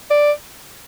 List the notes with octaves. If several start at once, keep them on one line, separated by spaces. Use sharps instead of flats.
D5